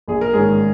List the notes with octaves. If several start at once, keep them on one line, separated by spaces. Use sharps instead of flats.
A#1 G#4
A#4
G#2 D#3 C#4 G#4